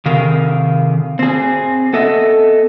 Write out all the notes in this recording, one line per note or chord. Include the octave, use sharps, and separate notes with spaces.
C3 D#3 G#4 A#4 F5
C4 G#4
B3 A4 D#5 E5